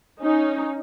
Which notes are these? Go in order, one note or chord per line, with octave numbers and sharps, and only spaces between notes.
C#4 D#4